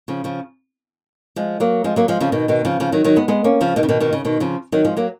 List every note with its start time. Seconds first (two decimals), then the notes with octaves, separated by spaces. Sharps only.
0.08 C#3 F3
0.24 C#3 F3
1.36 F3 G#3
1.60 F#3 A#3
1.84 F3 G#3
1.96 F#3 A#3
2.08 F3 G#3
2.21 C#3 F3
2.32 B2 D#3
2.48 B2 D#3
2.65 C#3 F3
2.80 C#3 F3
2.92 D#3 F#3
3.04 D#3 F#3
3.16 G#3 B3
3.28 G#3 B3
3.44 A#3 C#4
3.61 C#3 F3
3.76 B2 D#3
3.83 C#3
3.89 B2 D#3
4.00 B2 D#3
4.13 C#3
4.25 B2 D#3
4.40 C#3 F3
4.72 D#3 F#3
4.85 F3 G#3
4.97 F#3 A#3